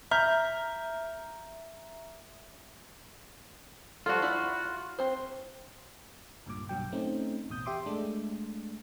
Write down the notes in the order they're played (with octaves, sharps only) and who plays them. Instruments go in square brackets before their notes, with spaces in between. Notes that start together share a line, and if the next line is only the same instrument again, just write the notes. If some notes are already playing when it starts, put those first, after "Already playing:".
[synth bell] E5 [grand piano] A#5 F6 G6
[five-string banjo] F3 G3 A4 [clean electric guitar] F4 F#4
[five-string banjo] E4 D5
C4 C5
[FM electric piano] C#2 G2 A#2 D6
B1 G2 F#3 G5
A3 C4 C#4 D#4
A1 E2 B2 D#6 G6
G4 E5 C6 D6
G#3 A3 D4